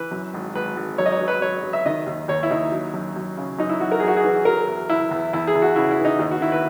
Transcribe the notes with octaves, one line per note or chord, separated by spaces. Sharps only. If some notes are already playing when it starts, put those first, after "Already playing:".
Already playing: E3 B4
F#2
G#1
G#1 B4
G#1
F#2 C#5
D#5
C#5
F#3
B4
F#3 C#5
F#3
E5
D#3 D#5
D#2
D#2 C#5
E4
D#2 D#4
F#3
F#2
F#2
C#3
F#2 D#4
E4
F#2 F#4
A#4
F#2 G#4
F#4
G#4
E3
F#3 A#4
E2
E2 E4
E2
E2 E4
G#4
E2
F#4
C#3 E4
E4
E3
D#4
D#2
F#4
D#3 E4
B4